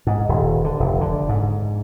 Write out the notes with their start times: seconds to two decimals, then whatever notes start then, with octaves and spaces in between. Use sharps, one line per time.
0.07 G#2
0.29 D#1
0.64 D3
0.80 F1
1.01 D3
1.29 G#2